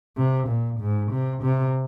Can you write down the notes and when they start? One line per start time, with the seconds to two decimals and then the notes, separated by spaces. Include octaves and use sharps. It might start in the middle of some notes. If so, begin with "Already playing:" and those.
0.17 C3
0.48 A#2
0.80 G#2
1.11 C3
1.43 C3